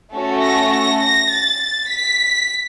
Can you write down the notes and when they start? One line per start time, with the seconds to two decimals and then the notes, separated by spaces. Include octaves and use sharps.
0.13 A3 C#4 F#4 A4
0.42 A#6
0.72 A#6
1.02 A#6
1.31 A6
1.89 B6